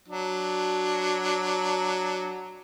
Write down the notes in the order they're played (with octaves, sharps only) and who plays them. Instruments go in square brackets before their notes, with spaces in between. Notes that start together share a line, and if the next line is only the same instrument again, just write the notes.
[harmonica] F#3 D4